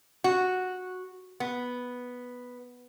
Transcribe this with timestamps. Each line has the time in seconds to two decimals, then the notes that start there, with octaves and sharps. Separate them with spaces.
0.24 F#4
1.40 B3